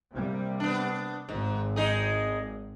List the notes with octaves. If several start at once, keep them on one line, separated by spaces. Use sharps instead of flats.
C3 G3 A#3
B3 D4
G#1 G#2
G#3 D#4 G#4